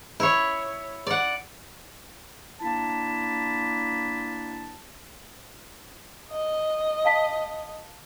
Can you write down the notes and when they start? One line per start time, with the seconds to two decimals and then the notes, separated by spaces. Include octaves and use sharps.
0.20 E4 C#5
1.07 D5 F#5
2.60 A#3 D4 E4 A5
6.31 D#5
7.05 F5 A5 B6